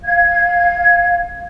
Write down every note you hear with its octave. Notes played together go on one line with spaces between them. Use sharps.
F5 G#6